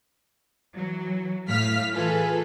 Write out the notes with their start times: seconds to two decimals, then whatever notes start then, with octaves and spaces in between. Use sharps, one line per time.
0.76 E3 F#3
1.48 A2 F5 F6 B6
1.93 E3 F4 G#4 A4 B4